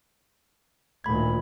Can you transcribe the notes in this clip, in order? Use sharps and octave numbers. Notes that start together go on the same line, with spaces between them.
D2 A#2 D#3 B5 G#6